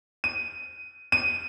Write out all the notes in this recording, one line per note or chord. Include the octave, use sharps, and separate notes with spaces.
D#7
D#7